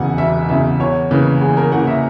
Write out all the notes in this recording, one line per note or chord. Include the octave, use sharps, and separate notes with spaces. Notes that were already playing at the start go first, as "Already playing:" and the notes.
Already playing: E1 E2 C#3 F#5 G#5
E1 E5
E2 C#3 E5
E2 C#5
C#3 E3 A#3 B4
E2 G#4
A#4
C#3 E3 A#3 F#5
E5